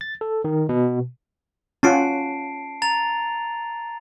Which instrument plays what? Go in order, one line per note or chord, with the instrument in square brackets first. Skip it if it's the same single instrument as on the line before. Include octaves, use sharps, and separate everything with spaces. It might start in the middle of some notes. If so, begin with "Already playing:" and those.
[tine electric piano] A6
A4
D#3
B2
[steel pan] C#4 F4 F#5 [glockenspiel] A5 C7 D7
[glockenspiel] A#5 A6 F7